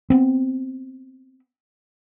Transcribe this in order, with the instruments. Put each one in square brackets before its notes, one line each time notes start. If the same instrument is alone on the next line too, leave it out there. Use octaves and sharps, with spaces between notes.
[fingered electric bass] B3 C4